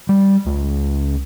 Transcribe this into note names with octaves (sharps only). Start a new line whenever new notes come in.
G3
C#2